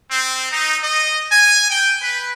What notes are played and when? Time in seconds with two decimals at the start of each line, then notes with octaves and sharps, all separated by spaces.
0.11 C4
0.52 D#4
0.82 D#5
1.32 G#5
1.70 G5
2.01 B4